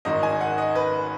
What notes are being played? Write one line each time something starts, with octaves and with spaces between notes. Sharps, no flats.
G#1 G#2 D#3 D#5
G#5
F#5
D#5
B4